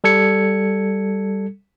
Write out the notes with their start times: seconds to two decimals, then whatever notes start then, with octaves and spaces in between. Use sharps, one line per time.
0.04 G3 A4 G#6 C#7